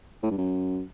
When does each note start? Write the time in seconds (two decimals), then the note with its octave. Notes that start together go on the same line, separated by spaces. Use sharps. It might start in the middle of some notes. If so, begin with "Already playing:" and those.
0.23 A2
0.30 G2
0.38 F#2